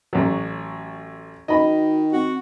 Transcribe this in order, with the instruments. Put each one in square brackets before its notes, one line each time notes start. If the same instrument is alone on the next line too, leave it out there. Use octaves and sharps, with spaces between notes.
[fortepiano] A1 F#3
[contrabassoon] D#3 [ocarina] F#4 [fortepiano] D#5 B5
[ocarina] C4 [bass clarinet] F#4